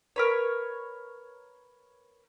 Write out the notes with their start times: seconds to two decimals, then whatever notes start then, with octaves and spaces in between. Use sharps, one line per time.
0.16 A#4 B4 C#5